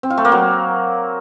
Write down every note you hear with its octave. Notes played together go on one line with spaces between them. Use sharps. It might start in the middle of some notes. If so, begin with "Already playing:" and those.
C4
F4
A3
A#3
F#3